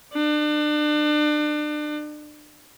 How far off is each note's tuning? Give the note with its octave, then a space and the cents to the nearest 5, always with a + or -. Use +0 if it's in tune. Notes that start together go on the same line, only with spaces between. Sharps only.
D4 +35